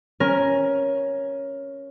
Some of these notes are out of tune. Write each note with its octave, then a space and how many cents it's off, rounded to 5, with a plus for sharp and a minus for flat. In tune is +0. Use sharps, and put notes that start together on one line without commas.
C#4 +0 A#4 +10